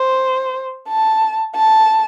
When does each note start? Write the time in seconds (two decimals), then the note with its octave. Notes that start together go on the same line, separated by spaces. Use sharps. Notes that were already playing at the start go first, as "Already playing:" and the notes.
Already playing: C5
0.89 A5
1.56 A5